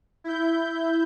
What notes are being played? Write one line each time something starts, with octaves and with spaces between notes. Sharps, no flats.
E4 G6